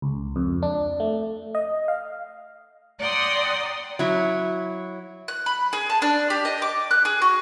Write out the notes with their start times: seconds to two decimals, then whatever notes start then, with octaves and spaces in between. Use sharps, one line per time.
0.02 C#2
0.36 F2
0.63 D4
1.00 A3
1.55 D#5
1.88 F5
3.00 D5 F#5 G5 A#5 C6 D#6
3.99 F#3 E4
5.28 F#6
5.46 B5
5.73 G#4
5.90 A5
6.02 D4
6.30 G4
6.45 D#5
6.62 D6
6.91 F#6
7.05 G#4
7.22 F#4